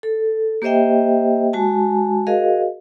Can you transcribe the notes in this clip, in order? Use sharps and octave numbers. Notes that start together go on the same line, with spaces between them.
A4
A#3 G4 C5 D#5 E5 G5
G#3 F#4 G#5 A5
F#4 G#4 A#4 D#5 F5